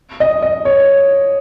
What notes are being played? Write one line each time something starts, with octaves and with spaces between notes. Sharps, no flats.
D#5
D#5
C#5